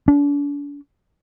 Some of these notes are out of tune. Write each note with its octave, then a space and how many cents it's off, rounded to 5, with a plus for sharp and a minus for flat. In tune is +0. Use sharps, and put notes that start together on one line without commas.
D4 -40